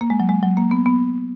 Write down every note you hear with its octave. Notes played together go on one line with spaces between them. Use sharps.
A#3
G#3
F#3
G#3
F#3
A#3
B3
B3